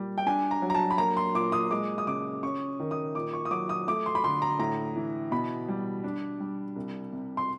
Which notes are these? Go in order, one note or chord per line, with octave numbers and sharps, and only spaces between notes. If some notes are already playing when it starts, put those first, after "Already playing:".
Already playing: A#2 G3
G5
D4 G#5
A#5
F#3
A#5
A5
B5
A#3 A#5
C6
A#2 D6
D#6
G#3 D6
D#6
C#3 D6
C#4 C#6
D#3
D#6
A#2 D6
C#6
D#6
F#3 D6
D#6
A3 D6
C6
B5
D3 C6
A#5
A2 A#5
E3
B2 B5
G3
D4
G3
C2
C3
C6